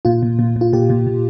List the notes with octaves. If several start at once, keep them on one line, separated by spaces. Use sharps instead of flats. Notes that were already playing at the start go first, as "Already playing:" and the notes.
A#2 F4
A#2
A#2
A#2
F4
A#2 G4
A#2
A#2